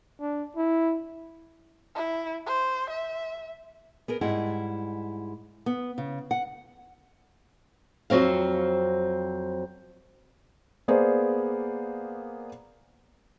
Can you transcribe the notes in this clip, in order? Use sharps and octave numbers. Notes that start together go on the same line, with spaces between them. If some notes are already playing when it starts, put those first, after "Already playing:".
D4
E4
E4
C5
E5
B3 G#4 A#4
G#2 G3 E4 G#4 F#5
B3
C#3
F#5
F2 F#3 C4 F5
A#3 B3 G#4 C5 D5